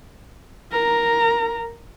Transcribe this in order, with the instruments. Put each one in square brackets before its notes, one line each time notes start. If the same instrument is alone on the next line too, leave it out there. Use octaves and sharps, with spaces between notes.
[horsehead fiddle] A#4 A#5